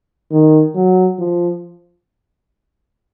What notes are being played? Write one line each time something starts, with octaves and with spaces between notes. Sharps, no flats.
D#3
F#3
F3